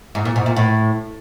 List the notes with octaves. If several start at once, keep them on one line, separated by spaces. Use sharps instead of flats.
G#2
A#2
G#2
A#2
A2